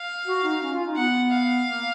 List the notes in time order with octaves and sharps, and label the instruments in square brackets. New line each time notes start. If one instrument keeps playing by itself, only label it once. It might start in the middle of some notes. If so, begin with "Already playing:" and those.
Already playing: [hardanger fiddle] F5
[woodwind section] F#4
D#4
C#4
F4
D#4
[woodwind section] B3 [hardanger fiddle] F#5
[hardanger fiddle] F5
[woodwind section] A#3